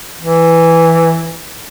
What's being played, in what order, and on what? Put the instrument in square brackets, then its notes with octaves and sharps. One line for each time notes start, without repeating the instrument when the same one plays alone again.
[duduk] E3